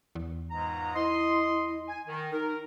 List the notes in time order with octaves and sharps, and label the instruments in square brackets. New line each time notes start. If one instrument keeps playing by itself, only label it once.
[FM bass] E2
[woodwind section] C#2 G#2 A#5
[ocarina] E4 [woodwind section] D#5 C6
[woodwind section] G#5
D#3
[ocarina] D#4 [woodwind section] A#4